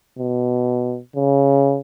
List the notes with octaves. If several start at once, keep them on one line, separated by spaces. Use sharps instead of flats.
B2
C#3